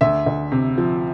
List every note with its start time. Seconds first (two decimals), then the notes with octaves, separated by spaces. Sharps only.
0.01 D2 E5
0.26 D2
0.52 C3
0.78 F3